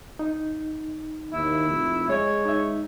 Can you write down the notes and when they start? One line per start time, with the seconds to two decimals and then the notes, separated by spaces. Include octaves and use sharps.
0.19 D#4
1.33 D#2 E4
1.69 F1
2.09 G#3 C#5
2.45 D#4 E5